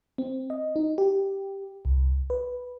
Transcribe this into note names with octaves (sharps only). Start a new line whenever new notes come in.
C4
D#5
D#4
G4
C2
B4